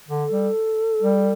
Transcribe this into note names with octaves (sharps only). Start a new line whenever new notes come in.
D3
A4
G3
G3